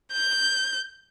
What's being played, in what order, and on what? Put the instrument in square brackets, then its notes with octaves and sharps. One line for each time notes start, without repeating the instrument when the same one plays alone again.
[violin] G6